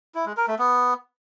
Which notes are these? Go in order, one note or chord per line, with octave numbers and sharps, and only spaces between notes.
E4
G#3
A#4
A3
B3